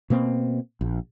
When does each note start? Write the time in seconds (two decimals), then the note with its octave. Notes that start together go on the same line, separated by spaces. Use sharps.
0.10 B2 A#3 C4
0.81 A#1